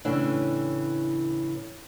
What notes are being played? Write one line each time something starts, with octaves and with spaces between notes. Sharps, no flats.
A2 C#3 E3 D4